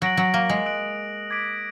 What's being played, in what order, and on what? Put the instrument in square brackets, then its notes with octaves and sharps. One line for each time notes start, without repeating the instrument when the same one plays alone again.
[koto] F#3 [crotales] F#6 A#6 D7 F#7
[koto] F#3
A#3
G#3
[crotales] D#6 F#6 D7 F#7
D6 G#6 B6 D7